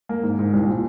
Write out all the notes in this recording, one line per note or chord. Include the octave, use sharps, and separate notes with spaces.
A#3
G#2
G#2
C2
A#2